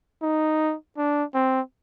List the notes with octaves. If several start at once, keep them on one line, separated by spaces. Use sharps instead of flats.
D#4
D4
C4